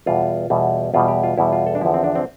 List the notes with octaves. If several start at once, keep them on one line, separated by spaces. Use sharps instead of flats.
E2 B2 G3 F4
E2 B2 G3
E2 B2 G3 F4
G4
F4
E2 B2 G3 E4
F4
A4
D4
E2 D3 F3 E4
C4
D4
C4